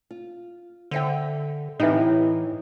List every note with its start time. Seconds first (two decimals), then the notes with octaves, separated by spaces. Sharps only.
0.11 F4
0.91 D3 C5 E5 G5
1.80 A2 E3 C4 D#4 E4 G4